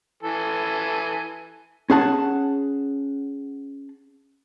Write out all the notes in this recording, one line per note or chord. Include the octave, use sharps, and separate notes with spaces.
E3 A4 G#5
C#4 G#4 F#5 A5